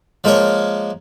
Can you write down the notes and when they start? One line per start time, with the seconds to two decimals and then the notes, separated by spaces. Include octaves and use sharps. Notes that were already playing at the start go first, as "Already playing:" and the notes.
0.24 F3 G#3 A#3 A#4 C#5